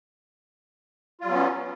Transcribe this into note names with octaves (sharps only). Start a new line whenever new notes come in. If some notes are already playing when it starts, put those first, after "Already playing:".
F#3 G3 B3 C#4 F4